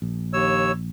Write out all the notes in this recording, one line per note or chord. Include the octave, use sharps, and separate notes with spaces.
A#1
D#2 C#5 E6